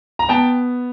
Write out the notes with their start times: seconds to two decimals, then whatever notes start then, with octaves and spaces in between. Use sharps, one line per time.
0.19 A#5
0.29 B3 G5 A5